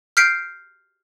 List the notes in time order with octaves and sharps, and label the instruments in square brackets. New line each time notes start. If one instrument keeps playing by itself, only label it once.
[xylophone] F6 G6 B6 C7 D7